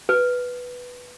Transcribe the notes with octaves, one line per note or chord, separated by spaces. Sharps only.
B4